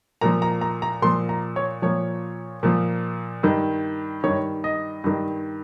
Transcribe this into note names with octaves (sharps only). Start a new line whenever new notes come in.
A#2 F3 A#5
A#5
A#5
A#5
A#2 F3 C6
A#5
C#5
A#2 F3 C#5
A#2 F3
G2 D#3
G2 D#3 C#5
D#5
G2 D#3